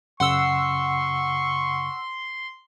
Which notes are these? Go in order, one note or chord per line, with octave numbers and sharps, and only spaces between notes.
F#2 C#3 F#5 C6 C#6 E6